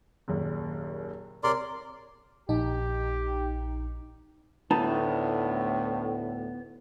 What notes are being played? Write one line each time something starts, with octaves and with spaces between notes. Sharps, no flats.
F#1 D#2 A#2
C2 A#4 C#5 D5 C6 D6
A#1 D#4 G4
D2 A2 B3 D#4 A5